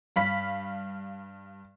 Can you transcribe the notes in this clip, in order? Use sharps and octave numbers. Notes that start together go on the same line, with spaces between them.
G2 F5 B5 B6